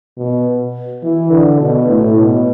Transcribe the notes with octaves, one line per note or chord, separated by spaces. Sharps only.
B2
E3
D3
B2
A2
B2